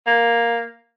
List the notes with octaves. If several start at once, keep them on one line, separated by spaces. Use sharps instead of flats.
A#3